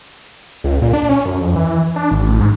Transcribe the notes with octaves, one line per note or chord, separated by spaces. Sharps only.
C#2
A#2
D4
C#4
F#2
F2
E3
D4
G#1
A1
G#2